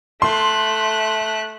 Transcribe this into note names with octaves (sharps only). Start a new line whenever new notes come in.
A3 C6 F#6